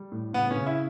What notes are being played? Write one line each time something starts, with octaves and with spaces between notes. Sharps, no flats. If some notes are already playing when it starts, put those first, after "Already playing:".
Already playing: G3
A2
C#3 B3
C#3 C#4
E4